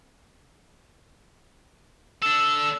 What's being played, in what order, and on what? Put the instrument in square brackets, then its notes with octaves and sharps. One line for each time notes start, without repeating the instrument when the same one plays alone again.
[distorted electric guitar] D4 A4 [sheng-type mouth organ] E6